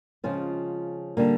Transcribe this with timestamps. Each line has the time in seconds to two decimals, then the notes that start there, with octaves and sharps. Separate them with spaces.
0.24 C#3 F3 G#3 C4 F4
1.17 D3 G3 A#3